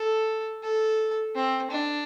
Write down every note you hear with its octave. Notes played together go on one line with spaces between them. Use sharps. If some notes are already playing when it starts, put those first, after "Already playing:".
Already playing: A4
A4
C4
D4